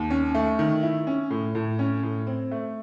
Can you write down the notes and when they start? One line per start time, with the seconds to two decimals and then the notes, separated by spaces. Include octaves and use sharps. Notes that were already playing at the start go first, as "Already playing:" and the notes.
Already playing: D#2
0.10 C#4
0.35 A3
0.59 D#3
0.83 E4
1.07 C#4
1.31 A2
1.55 A2
1.79 C#4
2.03 A2
2.27 C4
2.51 A3